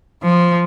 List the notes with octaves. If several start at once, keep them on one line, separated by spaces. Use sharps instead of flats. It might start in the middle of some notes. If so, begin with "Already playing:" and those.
F3